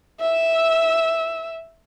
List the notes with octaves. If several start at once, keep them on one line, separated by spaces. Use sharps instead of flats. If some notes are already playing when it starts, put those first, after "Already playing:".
E5 E6